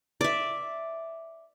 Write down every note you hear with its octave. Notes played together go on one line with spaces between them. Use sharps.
D5 E5